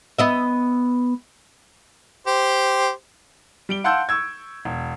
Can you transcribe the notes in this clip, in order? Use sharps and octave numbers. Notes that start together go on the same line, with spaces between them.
B3 D#5 E5
G4 C5
G3 D7 G7
F5 F#5 A5 C6 E6 G6
C#6 E6 G#6
E1